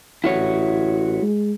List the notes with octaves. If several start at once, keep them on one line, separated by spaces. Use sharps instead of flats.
A1 E4 F#4 C#5
G#3